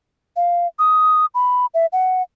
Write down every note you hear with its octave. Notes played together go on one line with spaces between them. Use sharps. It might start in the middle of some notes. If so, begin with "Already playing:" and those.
F5
D#6
B5
E5
F#5